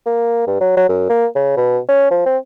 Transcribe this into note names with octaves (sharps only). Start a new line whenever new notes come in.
A#3
G2
F#3
F#3
F#2
A#3
C#3
B2
C#4
F3
C4